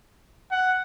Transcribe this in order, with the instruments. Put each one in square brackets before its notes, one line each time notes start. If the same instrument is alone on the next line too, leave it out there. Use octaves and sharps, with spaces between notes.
[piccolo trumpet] F#5